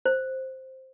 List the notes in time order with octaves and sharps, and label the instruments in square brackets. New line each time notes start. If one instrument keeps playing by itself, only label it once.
[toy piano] C5